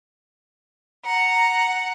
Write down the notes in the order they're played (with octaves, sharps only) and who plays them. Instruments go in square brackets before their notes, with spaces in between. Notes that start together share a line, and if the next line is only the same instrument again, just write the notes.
[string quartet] F#5 [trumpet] A#5